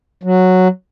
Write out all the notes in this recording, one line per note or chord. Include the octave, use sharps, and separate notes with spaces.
F#3